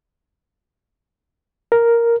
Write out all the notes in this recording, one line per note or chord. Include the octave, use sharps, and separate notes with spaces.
A#4